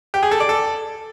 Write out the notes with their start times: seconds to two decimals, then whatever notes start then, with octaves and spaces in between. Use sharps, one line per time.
0.14 G4
0.23 G#4
0.31 A4
0.40 D5
0.49 A4